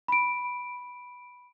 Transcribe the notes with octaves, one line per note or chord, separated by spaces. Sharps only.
B5 D7